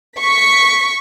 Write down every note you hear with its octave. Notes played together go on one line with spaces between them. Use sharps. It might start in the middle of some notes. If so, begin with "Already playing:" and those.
C#6 B6